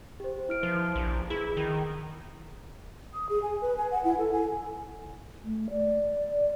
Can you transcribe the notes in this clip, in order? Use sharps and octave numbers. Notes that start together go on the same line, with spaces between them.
G4 C5
E4 F6 D7
F3 B4
A#1
E4 G#4
D#3
D#6
G#4
G#5
B4
G#5
F#5
E4
A4
G#5
A3
D5